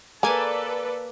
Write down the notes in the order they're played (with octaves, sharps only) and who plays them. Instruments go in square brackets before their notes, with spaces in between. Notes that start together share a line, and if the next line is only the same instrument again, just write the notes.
[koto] A#3 G#5 A5 [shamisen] G#4 [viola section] A4 B4 D5